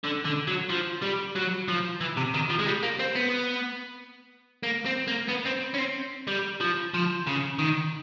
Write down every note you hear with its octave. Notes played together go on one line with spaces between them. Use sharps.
D3
D3
F#3
F3
G3
F#3
F3
E3
C3
D#3
F3
G#3
G3
A#3
C4
B3
A#3
C4
A#3
B3
C4
C#4
C4
G3
F3
F3
C#3
D#3